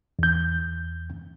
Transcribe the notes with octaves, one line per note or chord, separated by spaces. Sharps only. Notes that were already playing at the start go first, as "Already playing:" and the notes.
E2 G6